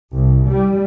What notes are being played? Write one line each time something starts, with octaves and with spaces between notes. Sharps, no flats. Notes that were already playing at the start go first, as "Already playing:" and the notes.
C2
G3